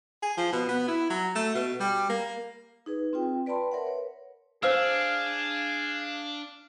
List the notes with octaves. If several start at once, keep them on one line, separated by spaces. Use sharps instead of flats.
G#4
F3
B2
B3
E4
F#3
A3
B2
G3
A#3
D#4 G#4 B4
C4 F4 G5
B4 D5 G5 A5 B5 C6
A#4 C#5 E5 F#5
B4 C#5
D4 G#4 C5 F5 E6